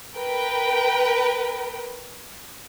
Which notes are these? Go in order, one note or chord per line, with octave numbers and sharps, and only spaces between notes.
A#4 B4 G5